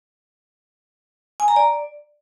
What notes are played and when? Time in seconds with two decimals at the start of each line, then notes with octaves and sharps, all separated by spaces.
1.40 G#5
1.48 A#5
1.56 D5